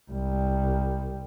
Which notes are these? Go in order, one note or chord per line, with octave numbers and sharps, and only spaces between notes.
C2 G3